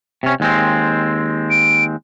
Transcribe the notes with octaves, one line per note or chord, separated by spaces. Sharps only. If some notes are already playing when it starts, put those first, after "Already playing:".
C3 C#4
D#2 G#3 C4
D7